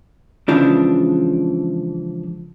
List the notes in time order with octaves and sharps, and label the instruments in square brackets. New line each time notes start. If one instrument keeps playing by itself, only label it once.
[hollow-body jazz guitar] C#3 E3 F3 G#3 D4